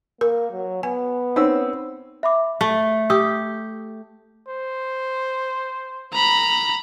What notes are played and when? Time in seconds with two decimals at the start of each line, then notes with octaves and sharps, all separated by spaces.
0.21 A#3 A#4
0.51 F#3
0.83 B3 G#5
1.36 C4 C#4 D#4 E6
2.23 E5 B5 D6
2.61 A3
3.10 G4 D#6 E6
4.48 C5
6.13 A#5 B5